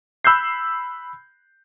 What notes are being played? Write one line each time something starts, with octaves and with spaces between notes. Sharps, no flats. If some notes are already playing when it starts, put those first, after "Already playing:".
B5 E6 F#6 G6 C7